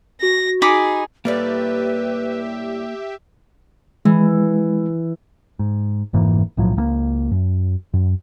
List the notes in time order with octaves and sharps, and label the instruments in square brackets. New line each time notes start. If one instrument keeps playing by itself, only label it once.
[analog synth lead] F#4 [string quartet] A#6
[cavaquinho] D#4 B5 D6 [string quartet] G#4
[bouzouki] A2 G3 D5 [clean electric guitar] A#3 F5 [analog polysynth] G4 E5 [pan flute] B4
[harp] E3 [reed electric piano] G#3
[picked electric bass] G#2
F1 G#2 E3 A#3
B1 A2 F3 F#3
C#2 F3 A#3
F#2
F#2